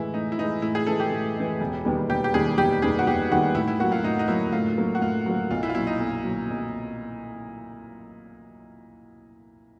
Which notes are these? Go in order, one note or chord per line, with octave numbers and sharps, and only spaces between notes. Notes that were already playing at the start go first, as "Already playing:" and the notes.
Already playing: A2 E3 G#3 E4
A2 D#4
E4
E3 G#3 D#4
A2 E4
G#4
E3 G#3 A4
G4
A2
E3 G#3
E1
D#2 D#3 G3 B3
E1 G4
G4
D#2 D#3 G3 B3 G#4
E1 G4
D#2 D#3 G3 B3 G#4
F#4
E1 G4
D#2 D#3 G3 B3 F#4
A2 E4
E4
F#3 A#3 F#4
F4
A2 D#4
D#4
F#3 A#3 E4
A2 F4
F#3 A#3
F#4
A2 F4
F#3 A#3
B1 F4
E4
F4
A#2 F#3 E4
D#4
B1
A#2 F#3
B1